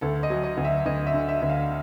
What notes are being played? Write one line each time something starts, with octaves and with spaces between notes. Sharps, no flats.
D2 A4
D#5
F#3
D#5
D2
E5
D2 D#5
E5
D3
E5
D2
F5